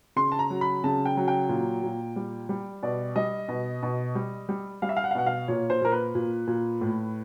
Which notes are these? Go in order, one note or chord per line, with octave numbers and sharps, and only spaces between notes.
C#3 C6
A5
A#5
F#3
B5
C#3 A5
G5
F#3
G5
A#2
A#2
G3
G3
B2 D5
G3 D#5
B2
B2
G3
G3
G3 F5
E5
F5
F#5
F5
B2 F#5
F5
A#2 C#5
C5
A#2 A#4
B4
A#2
A#2
A2